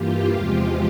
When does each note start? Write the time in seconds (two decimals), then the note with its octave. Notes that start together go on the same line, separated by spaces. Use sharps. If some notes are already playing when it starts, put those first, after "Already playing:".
Already playing: G2 E3 G3 A#3 F4 G4
0.29 E2 C3 F3 G#3